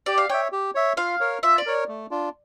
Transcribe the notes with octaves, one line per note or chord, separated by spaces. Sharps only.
G4 D5
F5
C#5 E5 G5
G4
C#5 E5
F4 F5
A#4 C#5
F4 E5
D5
A#4 C#5
A3
D4 F4